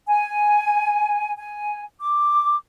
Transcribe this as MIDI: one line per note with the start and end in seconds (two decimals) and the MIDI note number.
0.07 1.33 80
1.37 1.82 80
2.00 2.54 86